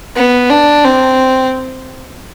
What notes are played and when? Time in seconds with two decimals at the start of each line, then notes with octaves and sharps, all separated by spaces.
0.16 B3
0.50 D4
0.84 C4